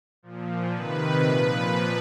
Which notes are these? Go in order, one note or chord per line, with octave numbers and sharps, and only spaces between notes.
A#2 F3
C3 D#3 B4
A#2 F3 B4